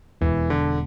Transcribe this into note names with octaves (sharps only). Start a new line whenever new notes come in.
E1 E3
D3